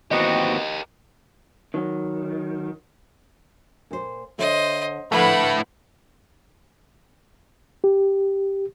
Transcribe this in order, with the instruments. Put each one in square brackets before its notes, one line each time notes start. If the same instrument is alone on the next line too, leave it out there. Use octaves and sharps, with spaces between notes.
[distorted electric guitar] D#2 C4 [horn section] E3 B3 F#4 [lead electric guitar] G4 A#4 [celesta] D#5
[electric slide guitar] D#3 F#3
[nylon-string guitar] A#2 C5
[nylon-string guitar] D3 C#5 E5 [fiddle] C5 D#5
[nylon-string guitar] D3 F3 [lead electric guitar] A3 E4 [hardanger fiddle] B4 F#5 [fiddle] B5
[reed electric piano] G4